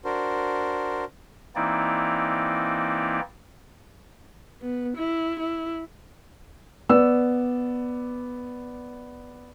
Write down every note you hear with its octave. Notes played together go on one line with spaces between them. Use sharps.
D4 F#4 A#4 C5
E3 A#3 C4 D#4 E4 D5
B3
E4
E4
B3 D5 E6